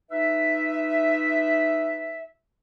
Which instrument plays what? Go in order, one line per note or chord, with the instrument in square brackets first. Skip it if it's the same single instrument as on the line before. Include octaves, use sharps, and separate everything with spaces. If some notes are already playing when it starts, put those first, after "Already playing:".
[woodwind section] D#4 F4 B4 E5